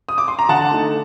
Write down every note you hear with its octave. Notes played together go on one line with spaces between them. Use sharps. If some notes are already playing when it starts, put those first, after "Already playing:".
D#6
D6
C6
A#5
D3 F#5 A5
A3 D#4